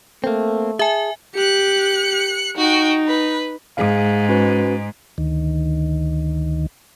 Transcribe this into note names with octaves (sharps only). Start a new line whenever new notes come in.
A3 A#3 C4
G#4 E5 G#5 A5
G4 F#6 C#7
D#4 F#4 G5
B4
G#2 G#4 F5
C#4 F#4 B4
D2 D#3